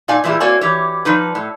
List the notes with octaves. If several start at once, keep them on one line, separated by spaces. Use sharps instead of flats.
A#2 D#4 D5 F5 G#5
A#2 E3 G3 E4 G#4
A#3 C4 F#4 C#5 D5 G#5
E3 G4 C#5
F3 G3 D#4 B4
A2